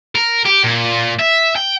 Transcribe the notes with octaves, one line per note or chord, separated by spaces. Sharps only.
A#4
G4
A#2
E5
G5